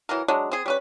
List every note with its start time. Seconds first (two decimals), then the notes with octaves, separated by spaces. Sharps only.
0.09 E3 F#3 A#4
0.28 F#3 G#3 D4
0.51 C4 G#4
0.66 G3 C#4 B4